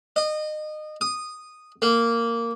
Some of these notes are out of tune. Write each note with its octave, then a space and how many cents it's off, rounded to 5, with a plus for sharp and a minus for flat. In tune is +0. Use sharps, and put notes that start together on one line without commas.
D#5 -25
D#6 -10
A#3 -10